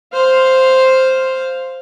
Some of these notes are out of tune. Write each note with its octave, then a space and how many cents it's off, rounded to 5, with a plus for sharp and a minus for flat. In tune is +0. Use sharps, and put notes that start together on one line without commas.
C5 +0 F5 +0